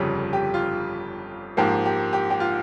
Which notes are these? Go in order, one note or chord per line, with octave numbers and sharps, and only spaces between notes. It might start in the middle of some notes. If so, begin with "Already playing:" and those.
Already playing: G1 F2 C#3 G3
G4
F4
G#2 F3 A#3 G4
G4
G4
G4
F4